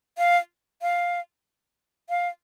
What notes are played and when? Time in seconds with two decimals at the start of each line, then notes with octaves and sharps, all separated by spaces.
0.18 F5
0.82 F5
2.09 F5